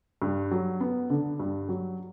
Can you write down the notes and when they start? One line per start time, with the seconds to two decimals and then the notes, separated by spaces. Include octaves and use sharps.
0.22 G2
0.51 F#3
0.81 B3
1.10 D3
1.39 G2
1.69 F#3